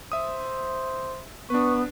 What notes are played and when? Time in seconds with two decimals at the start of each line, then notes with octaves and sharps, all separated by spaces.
0.12 C5 E5 D#6
1.50 B3 D4 B4 C#6